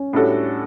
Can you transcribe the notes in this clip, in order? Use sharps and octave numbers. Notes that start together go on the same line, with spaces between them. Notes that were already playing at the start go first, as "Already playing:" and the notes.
Already playing: C#4
A2 G3 D4 F#4 A4